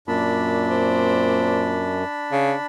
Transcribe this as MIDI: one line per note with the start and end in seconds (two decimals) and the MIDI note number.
0.08 2.04 42
0.08 2.02 46
0.08 2.66 62
0.08 2.66 81
0.08 2.66 83
0.69 1.71 60
2.32 2.53 49